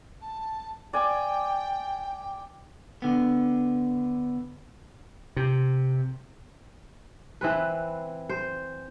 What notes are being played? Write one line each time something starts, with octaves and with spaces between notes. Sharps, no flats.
A5
D5 G5 G#5
D3 B3
C3
E3 C4 B4
C5